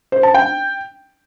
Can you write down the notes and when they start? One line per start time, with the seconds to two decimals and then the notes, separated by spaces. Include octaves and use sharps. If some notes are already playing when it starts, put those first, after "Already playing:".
0.12 C5
0.23 A5
0.34 G5